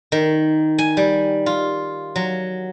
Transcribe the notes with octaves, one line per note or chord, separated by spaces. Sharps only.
D#3
G#5
G3
F4
F#3